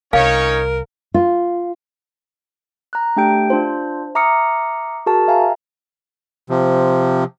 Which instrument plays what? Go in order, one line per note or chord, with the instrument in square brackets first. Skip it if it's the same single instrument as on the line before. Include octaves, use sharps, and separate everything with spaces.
[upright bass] C2 [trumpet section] C#4 D#4 C#5 [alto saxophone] A#4 [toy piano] F5
[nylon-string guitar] F4
[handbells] A#5 F#6
A3 D4 G4 G5 G6 D7
D4 F4 C5
E5 A#5 D6 D#6 F6 C#7
F#4 G#4 A#4 A5
E5 F5 G#5 A#5
[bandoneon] C3 F3